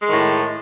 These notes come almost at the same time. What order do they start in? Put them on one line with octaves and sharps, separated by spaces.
G#3 D#3 A2